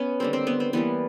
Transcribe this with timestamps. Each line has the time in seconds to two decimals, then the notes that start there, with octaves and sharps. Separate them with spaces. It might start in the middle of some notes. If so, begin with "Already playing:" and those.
Already playing: B3 C#4
0.20 D3 G3 A#3 C4
0.33 C4
0.47 B3
0.60 C4
0.73 E3 G3 A#3 B3